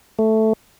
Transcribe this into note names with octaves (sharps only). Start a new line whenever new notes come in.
A3